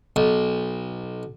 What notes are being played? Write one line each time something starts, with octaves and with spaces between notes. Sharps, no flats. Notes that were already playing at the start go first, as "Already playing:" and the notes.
B1